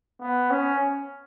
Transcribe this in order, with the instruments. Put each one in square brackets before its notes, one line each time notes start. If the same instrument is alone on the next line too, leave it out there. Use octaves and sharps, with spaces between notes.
[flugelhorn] B3
C#4